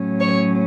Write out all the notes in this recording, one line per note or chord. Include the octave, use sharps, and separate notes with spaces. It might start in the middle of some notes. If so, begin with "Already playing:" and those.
Already playing: A2 F#3 C#4
C#5